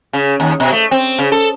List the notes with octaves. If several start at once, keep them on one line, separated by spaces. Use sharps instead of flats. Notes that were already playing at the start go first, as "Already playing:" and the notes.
C#3
D#2
B2
A3
C4
C#3
A4